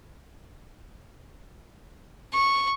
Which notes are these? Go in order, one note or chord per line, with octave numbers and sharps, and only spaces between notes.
C#6